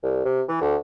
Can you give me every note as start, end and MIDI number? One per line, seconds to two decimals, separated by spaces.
0.03 0.22 36
0.25 0.42 48
0.48 0.60 52
0.61 0.76 38